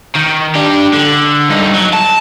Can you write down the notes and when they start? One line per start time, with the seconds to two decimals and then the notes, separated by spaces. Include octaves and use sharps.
0.15 D#3
0.55 D4 G4
0.93 D3
1.49 G2 D#4
1.74 F#3
1.93 A5